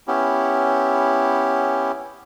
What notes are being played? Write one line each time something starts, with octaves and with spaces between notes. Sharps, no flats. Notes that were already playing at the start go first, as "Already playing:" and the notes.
B3 C#4 E4 G4